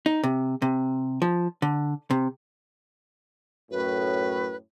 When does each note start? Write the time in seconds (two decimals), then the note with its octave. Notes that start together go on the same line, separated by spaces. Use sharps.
0.06 D#4
0.23 C3
0.62 C3
1.22 F3
1.62 D3
2.11 C3
3.71 F#2 A2 B4